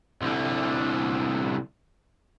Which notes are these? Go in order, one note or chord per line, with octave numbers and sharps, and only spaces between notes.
C2 D3